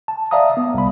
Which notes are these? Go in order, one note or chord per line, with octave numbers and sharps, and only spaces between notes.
A5
D5 E5 F5 A#5 D#6
B3
C2 B5